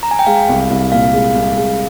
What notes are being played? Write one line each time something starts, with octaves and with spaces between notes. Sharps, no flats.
A#5
G#5
G5
G#3 F5
C2
C2
A#2 F5
G#3
C2
G#3